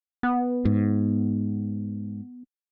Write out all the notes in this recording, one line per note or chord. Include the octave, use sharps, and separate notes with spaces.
B3
G#2